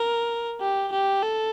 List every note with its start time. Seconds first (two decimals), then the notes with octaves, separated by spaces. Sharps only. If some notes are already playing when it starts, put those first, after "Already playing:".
Already playing: A#4
0.60 G4
0.92 G4
1.22 A4